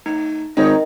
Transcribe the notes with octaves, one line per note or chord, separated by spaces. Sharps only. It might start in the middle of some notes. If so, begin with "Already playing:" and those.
A3 D#4
G#1 D#3 C4 D#4 C#5 D#5